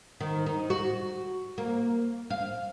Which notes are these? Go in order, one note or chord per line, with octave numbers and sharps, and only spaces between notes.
D#3
D#4
F#4
A#3
F5